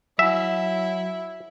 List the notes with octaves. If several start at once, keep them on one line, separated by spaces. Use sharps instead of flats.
F#3 E4 E5 F#5 G#5 E6